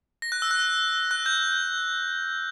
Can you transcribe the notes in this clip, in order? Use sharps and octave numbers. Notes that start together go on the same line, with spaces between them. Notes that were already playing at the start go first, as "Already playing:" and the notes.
A#6
F#6
E6
F#6
F#6
G6